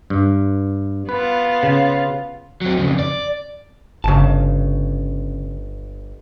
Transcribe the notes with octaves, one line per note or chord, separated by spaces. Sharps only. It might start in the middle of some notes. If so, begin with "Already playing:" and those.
G2
B3 F4 B4
C#3
F#3 C4
F2 C#3
D5
G1 C#3 A5